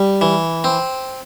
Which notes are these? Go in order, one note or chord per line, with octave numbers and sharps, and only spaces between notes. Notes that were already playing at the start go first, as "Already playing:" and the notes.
Already playing: G3
E3
C4